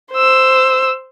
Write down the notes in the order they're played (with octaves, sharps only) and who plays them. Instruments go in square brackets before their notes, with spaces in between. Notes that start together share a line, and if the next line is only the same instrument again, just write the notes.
[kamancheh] C5 E6